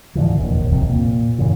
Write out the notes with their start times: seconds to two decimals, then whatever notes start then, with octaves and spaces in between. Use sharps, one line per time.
0.15 G#2 D3 E3 F3
0.36 E1 A#1 D#2
0.71 C2 F2 C3
0.89 A#2
1.38 F#2 A#2 C#3 E3